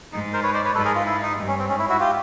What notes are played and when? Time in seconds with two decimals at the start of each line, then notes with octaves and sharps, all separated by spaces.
0.12 G#2 D#4
0.33 A#4 C5
0.43 B4 C#5
0.53 C5 D5
0.65 B4 C#5
0.75 G#2 A4 B4
0.85 G#4 A#4
0.95 F4
1.06 E4
1.22 D#4
1.38 G2
1.48 C#4
1.58 C4
1.69 G#2 C#4
1.79 E4
1.89 E4 F#4
2.00 F4 G4